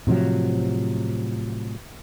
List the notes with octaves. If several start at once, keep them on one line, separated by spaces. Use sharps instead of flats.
A2 C3 F3 F#3